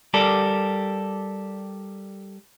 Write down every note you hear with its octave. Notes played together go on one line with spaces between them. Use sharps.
G3 G4 A4 A#4 D5